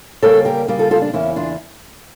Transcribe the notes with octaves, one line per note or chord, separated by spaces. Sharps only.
C#3 G3 A#3 A4 C#5
G4 A#4
C#3 G3 A#3
F4 A4
F4 A4
D4
E2 C#3 E3 A#3 C#4 E4
D4 F4